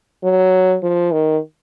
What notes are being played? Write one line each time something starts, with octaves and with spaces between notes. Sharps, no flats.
F#3
F3
D#3